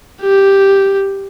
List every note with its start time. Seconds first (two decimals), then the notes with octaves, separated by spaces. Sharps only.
0.21 G4